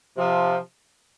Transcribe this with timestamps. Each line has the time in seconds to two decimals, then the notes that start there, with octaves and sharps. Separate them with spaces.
0.16 C3 F3